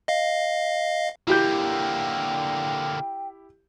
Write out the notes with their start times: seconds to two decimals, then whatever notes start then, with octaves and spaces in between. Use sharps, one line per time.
0.08 D#5 F5
1.27 D3 A#3 E4 G4 G5 G6